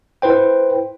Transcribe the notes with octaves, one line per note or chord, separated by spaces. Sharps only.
E4 B4 C5 G5